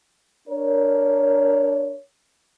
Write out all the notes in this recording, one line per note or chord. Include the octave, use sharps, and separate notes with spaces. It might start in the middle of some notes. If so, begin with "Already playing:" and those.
D4 A#4 C#5